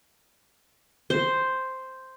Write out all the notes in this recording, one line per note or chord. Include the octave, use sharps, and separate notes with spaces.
C5